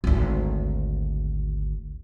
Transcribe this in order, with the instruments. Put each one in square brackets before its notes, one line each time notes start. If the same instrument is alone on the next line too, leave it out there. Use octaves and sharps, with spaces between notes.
[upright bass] G#1 D2